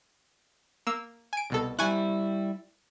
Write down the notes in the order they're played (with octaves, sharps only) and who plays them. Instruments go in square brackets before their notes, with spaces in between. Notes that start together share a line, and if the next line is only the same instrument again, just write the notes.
[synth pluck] A#3 E6
G#5 D7
C2 B2 A4
[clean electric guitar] G3 E4 [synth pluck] G#5 C#6 F#6